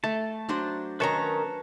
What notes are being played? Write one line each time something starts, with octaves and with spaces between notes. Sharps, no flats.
A3 A5
F#3 D4 C5
D#3 C#4 B4 A5 A#5 C#6